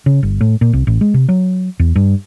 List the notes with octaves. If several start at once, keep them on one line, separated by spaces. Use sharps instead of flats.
C#3
G1
A2
A#2
C2
A1
G#3
C3
F#3
E2
G2